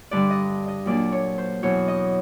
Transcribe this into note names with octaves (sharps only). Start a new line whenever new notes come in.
G2 D3 G3 D5
D#5
D#5
A#2 F#3 A#3 D4 D5
C#5
C5
E2 B2 F#3 C#5
D#5